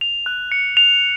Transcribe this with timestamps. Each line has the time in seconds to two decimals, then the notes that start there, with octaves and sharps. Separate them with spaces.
0.01 F7
0.26 F#6
0.52 C#7
0.77 F7